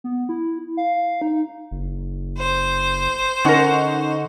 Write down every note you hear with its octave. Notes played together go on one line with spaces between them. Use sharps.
B3
E4
F5
D#4
F#1
C5
D3 C#4 D#4 A#4 F#5 C#6